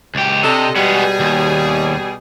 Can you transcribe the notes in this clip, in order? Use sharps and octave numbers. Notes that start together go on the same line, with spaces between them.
C#2 G4
C3 D4 A4 D#5
B2 G3 G#3 B3 G#4
D#2